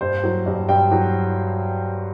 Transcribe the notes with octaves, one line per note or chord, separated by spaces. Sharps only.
G2 C5
F#3
G2
G2 G5
F#3